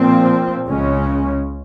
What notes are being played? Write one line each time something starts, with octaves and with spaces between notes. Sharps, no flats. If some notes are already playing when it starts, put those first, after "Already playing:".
Already playing: A#2 F3 C4
C#2 C#3 G#3 C#4